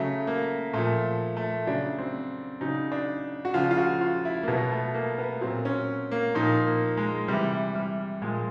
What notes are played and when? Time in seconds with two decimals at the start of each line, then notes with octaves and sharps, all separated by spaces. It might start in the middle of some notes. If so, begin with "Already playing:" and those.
Already playing: C#3 F#3 A3
0.27 A#3
0.73 A#2 F3 A3
1.37 A3
1.67 C#3 F#3 D4
1.98 C4
2.61 C#3 F#3 D#4
2.92 D4
3.45 F#4
3.54 C#3 F3 F4
3.71 F4
3.78 F#4
4.01 F4
4.25 E4
4.43 A#3
4.48 B2 F#3 B3
4.72 A3
4.94 A#3
5.18 B3
5.41 A#2 F#3 C4
5.65 C#4
6.11 A#3
6.34 A#2 F3 D#4
6.66 A#3
6.97 G#3
7.28 C3 E3 G3
7.75 G3
8.22 A#2 F3 G#3